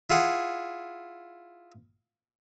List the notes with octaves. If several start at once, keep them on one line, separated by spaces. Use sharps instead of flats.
E4 F4 G#4 F#5